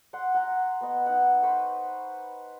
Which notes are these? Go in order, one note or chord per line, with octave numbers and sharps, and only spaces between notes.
F#5 C6
F#5 A#5
B3 D#5
D#4 F#5
B4 C5 B5 C#6